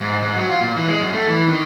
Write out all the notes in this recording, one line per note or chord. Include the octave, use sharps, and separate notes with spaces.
G#2
G#2
F#3
F4
A#2
E3
G#3
F#2
A3
E3
D#3